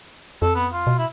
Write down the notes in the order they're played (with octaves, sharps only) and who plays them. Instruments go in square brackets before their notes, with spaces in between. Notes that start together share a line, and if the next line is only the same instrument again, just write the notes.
[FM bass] F2 [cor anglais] A4
[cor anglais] B3
F4
[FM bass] B2
[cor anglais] E4